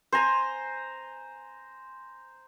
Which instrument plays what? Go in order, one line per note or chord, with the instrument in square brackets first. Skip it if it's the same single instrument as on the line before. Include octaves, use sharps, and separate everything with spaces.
[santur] C5 G#5 A#5